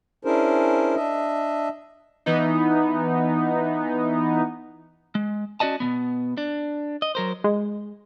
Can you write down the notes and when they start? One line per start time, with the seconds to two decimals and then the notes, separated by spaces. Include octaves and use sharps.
0.25 C#4 D4 E4 G#4 A#4 C5
0.96 D4 D#5 E5
2.26 E3 B3 D#4
5.15 G#3
5.60 C#4 F#4 D5 D#5 A5
5.80 B2 E3 B3
6.38 D4
7.02 D#5
7.15 F#3 A#4 C5
7.44 G#3